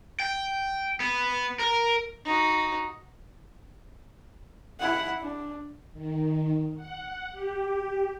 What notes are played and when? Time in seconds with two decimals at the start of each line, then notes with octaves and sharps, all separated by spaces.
0.20 G5
1.00 B3
1.59 A#4
2.25 D#4 F#4
4.80 E4 F#5
5.20 D4
5.93 D#3
6.76 F#5
7.32 G4